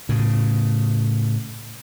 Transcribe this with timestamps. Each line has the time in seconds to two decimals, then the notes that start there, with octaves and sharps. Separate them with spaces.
0.09 A2 C#3